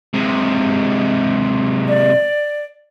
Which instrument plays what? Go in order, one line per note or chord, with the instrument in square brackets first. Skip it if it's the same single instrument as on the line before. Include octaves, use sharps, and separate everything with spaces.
[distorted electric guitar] C3 G#3
[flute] D5